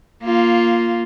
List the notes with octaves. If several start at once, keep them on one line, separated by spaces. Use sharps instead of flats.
A#3 F4